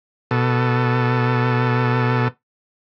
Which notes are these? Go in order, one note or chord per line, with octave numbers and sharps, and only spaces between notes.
B2 A4